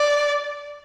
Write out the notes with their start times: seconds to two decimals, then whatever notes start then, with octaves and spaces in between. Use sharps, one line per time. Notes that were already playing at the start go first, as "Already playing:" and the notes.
Already playing: D5